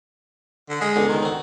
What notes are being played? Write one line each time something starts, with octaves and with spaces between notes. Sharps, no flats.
D3
G#3 D#5
C#2 B2 D3
D#3
C4 F#4